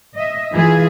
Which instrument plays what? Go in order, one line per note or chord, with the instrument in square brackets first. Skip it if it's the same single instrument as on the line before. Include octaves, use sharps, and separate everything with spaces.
[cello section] D#5 E5
E3 F4 G#4 E5